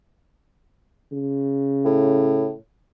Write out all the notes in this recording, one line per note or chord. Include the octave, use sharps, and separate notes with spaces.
C#3
A2